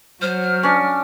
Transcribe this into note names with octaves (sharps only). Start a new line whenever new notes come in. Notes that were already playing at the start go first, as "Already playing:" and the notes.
F#3 C5 F6
C#4 D4